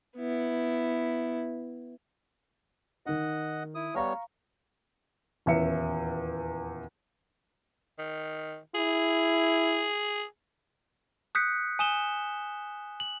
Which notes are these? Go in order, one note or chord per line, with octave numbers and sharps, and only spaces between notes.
B3 E4
D#3 D#4 D#5 F#5
E4 D#6
G3 B3 C#5 F5 A#5 C#6
D#1 E2 C#4 E5 C#7
D#3
E4 G#4
D#6 F#6 G6 B6 C#7
G#5 D#6 E7 G7
F#7